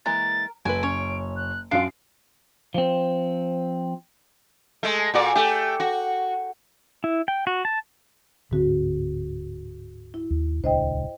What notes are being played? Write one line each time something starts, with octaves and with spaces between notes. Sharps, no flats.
E3 G#3 A#3 A#4 A6
F#1 F#4 A4 B4 G#5 D7
C#4 C#5
F#6
F#2 D4 F4 F5 C7 D7
F3 C4
G#3 A3
A#2 F#4 D5
A3 G4
F#4
E4
G5
F#4
A5
D1 G#2 D3 C4 F#4
E4
D#2
D#1 C#2 D4 C5 D#5 G5